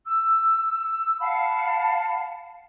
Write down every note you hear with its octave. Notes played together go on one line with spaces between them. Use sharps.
E6
F5 F#5 A5 B5